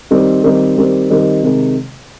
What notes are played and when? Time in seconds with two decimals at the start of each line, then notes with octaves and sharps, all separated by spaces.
0.10 D#3 G3 C4 D#4
0.44 D#3 G3 C4 D#4
0.77 D#3 G3 C4 D#4
1.10 D#3 G3 C4 D#4
1.43 C3 D#3 G#3